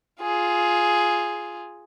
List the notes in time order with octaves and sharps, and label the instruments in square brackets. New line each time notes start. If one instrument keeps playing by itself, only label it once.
[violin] F4 G#4